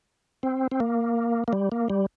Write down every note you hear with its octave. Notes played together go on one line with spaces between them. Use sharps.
C4
C4
A#3
A#3
G3
A#3
G3